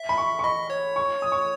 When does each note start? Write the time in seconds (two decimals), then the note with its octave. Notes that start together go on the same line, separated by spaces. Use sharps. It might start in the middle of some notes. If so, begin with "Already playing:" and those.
Already playing: E5
0.09 B5
0.18 C#6
0.39 C#6
0.44 D#5 B5
0.70 C#5
0.96 C#6
1.22 D#6
1.32 C#6